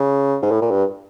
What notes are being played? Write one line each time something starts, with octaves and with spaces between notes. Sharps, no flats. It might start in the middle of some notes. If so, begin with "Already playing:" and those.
Already playing: C#3
G#2
A2
A#2
G2